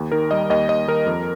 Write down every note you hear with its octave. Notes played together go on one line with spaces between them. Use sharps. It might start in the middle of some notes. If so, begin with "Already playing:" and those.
Already playing: D#2
D#3 A#4
G3 D#5
D#2 D#5
D#2 D#5
D#2 A#4
F2